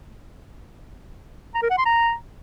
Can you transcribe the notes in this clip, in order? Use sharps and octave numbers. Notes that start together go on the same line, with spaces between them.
A#5
A#4
F#5
C6
A#5